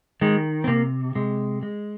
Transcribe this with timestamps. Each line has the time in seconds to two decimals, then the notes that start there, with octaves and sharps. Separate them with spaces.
0.21 D#3 G#3
0.64 C4
0.67 C3 A#3
1.15 C3 G#3
1.63 G#3